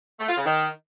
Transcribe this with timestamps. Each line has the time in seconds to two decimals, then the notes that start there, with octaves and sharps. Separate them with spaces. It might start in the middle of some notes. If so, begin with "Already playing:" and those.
0.20 A3
0.29 F4
0.37 C#3
0.46 D#3